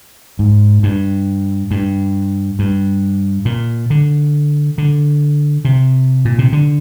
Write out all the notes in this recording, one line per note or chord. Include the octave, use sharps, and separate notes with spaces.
G#2
G2
G2
G2
A#2
D3
D3
C3
A#2
C3
D3